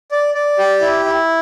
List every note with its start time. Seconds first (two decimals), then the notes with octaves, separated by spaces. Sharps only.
0.11 D5
0.35 D5
0.59 G4
0.81 E4
1.05 E4